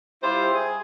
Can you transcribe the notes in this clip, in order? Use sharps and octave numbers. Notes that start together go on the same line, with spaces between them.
G3 E4 F4 G4 C5
G#4